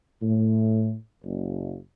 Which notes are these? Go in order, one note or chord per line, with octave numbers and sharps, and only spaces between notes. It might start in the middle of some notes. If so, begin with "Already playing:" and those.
A2
F#1